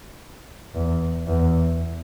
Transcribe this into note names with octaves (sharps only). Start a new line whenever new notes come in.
E2
E2